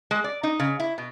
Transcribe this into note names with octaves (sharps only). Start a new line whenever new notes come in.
G#3
D5
D#4
C#3
E4
B2